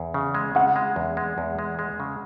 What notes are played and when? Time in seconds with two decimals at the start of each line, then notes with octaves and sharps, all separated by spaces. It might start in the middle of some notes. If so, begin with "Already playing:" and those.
Already playing: E2
0.14 C#3
0.35 G#3
0.55 C#3 F#5
0.76 G#3
0.96 E2
1.17 G#3
1.38 E2
1.59 G#3
1.79 G#3
2.00 C#3